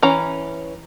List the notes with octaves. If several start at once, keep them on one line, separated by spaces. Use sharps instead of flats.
E3 C#4 A#5